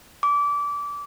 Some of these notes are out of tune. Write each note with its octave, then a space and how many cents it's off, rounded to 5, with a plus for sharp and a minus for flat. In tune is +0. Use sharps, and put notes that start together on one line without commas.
D6 -25